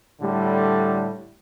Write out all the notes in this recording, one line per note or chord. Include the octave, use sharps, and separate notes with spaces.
A2 D3 G3